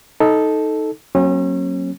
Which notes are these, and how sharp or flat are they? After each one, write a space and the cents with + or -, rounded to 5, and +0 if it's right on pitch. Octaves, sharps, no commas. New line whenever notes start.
D#4 +10 A4 -5
F#3 +5 A#3 +0 C#4 -35